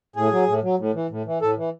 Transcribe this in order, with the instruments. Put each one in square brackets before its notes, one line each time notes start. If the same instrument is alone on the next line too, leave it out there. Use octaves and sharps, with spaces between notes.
[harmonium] A2 G#4
F#3
A2
F#3
A2
E3
A2
E3
A2 A4
E3